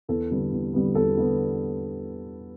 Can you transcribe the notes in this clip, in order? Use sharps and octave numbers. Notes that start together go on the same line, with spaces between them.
E2 A4
D3 G3 B3
E2
D3 G3 B3
E2 A4
D3 G3 B3